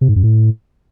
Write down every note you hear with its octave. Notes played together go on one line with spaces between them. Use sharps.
C3
G#2
F#2
A2